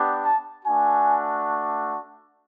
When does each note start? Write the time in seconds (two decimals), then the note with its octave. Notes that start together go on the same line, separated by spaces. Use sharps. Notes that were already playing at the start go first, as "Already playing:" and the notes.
Already playing: B3 D4 G4
0.23 A5
0.65 A3 D4 F#4 G#5